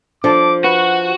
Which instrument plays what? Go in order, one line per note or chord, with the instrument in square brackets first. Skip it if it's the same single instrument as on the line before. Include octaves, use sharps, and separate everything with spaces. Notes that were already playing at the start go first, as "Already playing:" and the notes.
[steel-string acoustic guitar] F3 [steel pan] D4 A4 A5 [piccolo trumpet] D6
[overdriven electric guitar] F#4 [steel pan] B4 [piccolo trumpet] F#5